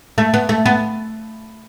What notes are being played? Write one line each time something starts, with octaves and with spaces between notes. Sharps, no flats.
A3
B3
A3
B3